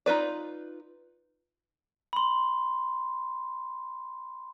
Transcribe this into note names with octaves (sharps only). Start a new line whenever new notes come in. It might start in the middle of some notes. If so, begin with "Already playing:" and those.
D#4 F4 B4 D5
B5 C6